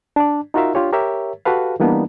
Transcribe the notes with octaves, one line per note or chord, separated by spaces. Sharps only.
D4 D5
D#4 F4 F#4 A#4 E5 F5
D4 F4 G4 C#5
G4 A#4 C#5 E5
F#4 G4 A4 B4 F5
E3 G3 A#3 B3 D4 D#4